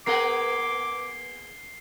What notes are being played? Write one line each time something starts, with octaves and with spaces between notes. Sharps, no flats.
A#3 B3 G#4 A#4 F#5 D6 C7 G7